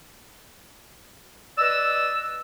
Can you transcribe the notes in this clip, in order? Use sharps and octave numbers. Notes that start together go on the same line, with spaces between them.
B4 D5 D#5 E6